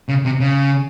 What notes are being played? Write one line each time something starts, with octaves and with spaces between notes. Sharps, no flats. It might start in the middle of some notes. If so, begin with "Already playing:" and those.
C#3
C3
C#3